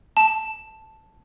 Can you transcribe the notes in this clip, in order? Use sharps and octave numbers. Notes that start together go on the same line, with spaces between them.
A5